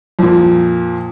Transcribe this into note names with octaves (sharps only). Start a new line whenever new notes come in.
F2 A#2